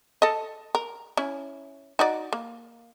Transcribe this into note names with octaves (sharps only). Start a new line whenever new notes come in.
A4 D#5
A#4
C#4 E4
D#4 F#4 D5
A#3